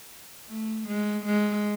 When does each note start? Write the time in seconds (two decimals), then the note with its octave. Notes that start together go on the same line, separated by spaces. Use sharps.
0.48 A3
0.88 G#3
1.26 G#3